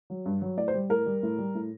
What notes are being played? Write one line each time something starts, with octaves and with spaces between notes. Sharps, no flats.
F#3
G2
F#3
A2 D5
C5
G3
A2 A#4
G3
A2
G3
A2